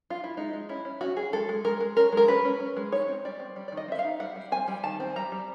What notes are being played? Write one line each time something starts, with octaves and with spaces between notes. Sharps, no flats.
F4
E4
G#3 D#4
G#3
C#4 E4
C#4
C#4 F#4
C#4 G#4
G#3 A4
G#3
G#3 A#4
G#3
C#4 A#4
G#3 A#4
C#4 B4
C#4
C#4
G#3
D#4 C#5
C4
G3 D5
C4
G3
D5
D#3
D#5
C4 E5
F5
D#4
G3 F#5
G3
C4 G#5
G3
D#3 A5
C4
G3 A#5
G3